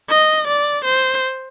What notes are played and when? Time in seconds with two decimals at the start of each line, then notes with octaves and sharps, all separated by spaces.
0.10 D#5
0.48 D5
0.85 C5